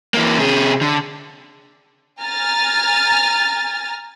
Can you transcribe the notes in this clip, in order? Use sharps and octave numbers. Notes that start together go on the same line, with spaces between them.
E3 A#3
C3 G#4
D3
G#5 A#5 F6 A6